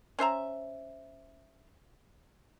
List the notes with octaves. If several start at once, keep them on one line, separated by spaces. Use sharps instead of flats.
C#4 C5 E5 A#5